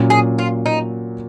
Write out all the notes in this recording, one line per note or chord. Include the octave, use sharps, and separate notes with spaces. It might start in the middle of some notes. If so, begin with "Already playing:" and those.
Already playing: A#2 F#3 C#4 F#4
G#4
F4
D#4